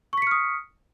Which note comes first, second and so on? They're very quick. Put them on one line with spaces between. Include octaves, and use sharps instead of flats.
C#6 B6 C#7 F6 D#6